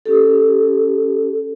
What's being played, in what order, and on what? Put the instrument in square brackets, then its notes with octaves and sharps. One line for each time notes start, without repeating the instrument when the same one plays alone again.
[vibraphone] C#4 G4 A4